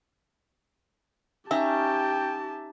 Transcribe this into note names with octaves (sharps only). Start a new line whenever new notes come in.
C#4 D#4 G4 E5 G5 A5